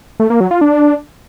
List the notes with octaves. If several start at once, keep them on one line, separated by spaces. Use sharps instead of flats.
A3
A#3
F#3
F4
D4